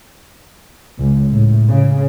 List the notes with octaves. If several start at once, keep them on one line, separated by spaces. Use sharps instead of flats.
C#2
A2
C#3